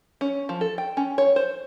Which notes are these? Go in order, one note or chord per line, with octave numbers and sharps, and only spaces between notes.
C#4
F3
A4
G5
C#4
C#5
C5